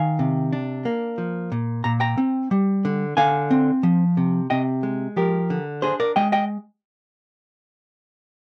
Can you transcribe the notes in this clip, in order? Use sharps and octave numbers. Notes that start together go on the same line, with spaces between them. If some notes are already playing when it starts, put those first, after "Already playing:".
Already playing: D#3 F5 G#5
C3
D4
A#3
F3
A#2
A#2 A#5
G5 A#5
C4
G3
D3
D3 F5 G#5
C4
F3
C3
C3 D#5 G5
G#3
F3 G4 A#4
D3
D4 G#4 C5
A#4 D5
G#3 D#5 G5
D#5 G5